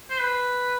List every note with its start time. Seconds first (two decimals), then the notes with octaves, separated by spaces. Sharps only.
0.10 C5
0.20 B4